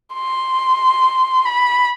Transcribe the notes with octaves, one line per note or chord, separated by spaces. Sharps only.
C6
B5